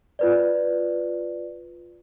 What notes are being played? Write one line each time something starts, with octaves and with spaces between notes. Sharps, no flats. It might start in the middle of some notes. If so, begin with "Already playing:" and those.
F4 B4 D5